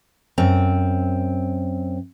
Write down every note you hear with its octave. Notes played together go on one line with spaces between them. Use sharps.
F#2 C4